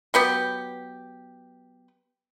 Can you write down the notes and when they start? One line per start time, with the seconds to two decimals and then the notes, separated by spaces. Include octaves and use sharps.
0.14 F#3 B3 G4